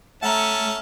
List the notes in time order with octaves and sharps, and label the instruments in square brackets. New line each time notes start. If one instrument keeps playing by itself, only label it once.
[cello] A3 [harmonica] C#4 A5 [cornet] E5 [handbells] F#5 A#5